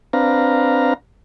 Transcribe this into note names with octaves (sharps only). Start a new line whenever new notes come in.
C4 D4 B4 F5 A#5